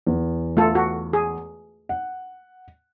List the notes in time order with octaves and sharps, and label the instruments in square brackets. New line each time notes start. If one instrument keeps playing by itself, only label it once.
[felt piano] E2
[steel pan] A3 F4 A4
F#4
G#4
[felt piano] F#5